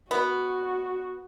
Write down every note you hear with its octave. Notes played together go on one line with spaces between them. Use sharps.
B3 F#4